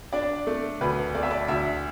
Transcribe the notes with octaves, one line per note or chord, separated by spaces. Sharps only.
D4 D5
A3
D2 B4
A3 D5
E5
D5
D2 E5